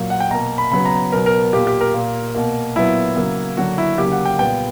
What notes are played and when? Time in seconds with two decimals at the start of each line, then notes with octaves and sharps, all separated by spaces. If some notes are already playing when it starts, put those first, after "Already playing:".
Already playing: A#2 F#3 A#3
0.10 F#5
0.20 G5
0.31 B2 A#3 A#5
0.58 B5
0.71 C#3 F#3 B3 B5
0.85 A#5
1.12 B2 F#3 B3 A#4
1.26 A#4
1.53 A#2 A#3 G4
1.67 G4
1.81 A#4
1.94 A#2 A#3
2.35 B2 A#3
2.76 A#2 F#3 B3 E4
3.16 C#3 F#3 A#3
3.57 D3 F#3 A#3 F#4
3.78 E4
3.98 C#3 F#3 A#3 G4
4.12 F#5
4.25 G5
4.39 A#2 G3 B3 G5